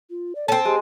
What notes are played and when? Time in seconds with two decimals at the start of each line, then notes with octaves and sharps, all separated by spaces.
0.10 F4
0.35 D5
0.48 C4 C#4 A4 A5
0.65 G#3 G4